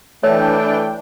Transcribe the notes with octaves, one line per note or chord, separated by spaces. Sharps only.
E3 A3 D4 C#5 G5